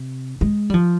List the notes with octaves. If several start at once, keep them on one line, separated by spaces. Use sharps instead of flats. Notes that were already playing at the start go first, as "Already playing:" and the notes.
Already playing: C3
G#3
G3
F3